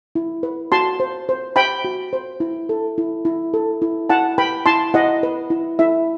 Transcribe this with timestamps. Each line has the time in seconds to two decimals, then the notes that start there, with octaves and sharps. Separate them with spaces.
0.15 E4
0.43 B4
0.72 F#4 A5 C6
1.00 C5
1.29 C5
1.56 C5 G5 B5
1.84 F#4
2.13 C5
2.40 E4
2.69 A4
2.98 E4
3.25 E4
3.54 A4
3.82 E4
4.09 E4 F#5 A5
4.38 B4 G5 B5
4.66 E4 A5 C6
4.94 E4 D#5 F#5
5.23 B4
5.50 E4
5.79 E4 E5